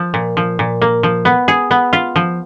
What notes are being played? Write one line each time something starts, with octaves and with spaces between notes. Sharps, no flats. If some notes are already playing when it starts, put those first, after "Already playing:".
Already playing: F3
A#2
F3
A#2
A#3
F3
B3
G#4
B3
F4
F3